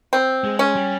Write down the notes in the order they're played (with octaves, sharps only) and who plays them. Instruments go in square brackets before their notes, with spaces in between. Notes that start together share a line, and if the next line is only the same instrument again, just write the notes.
[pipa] C4
[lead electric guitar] G#3
[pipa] C#4
[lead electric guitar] G3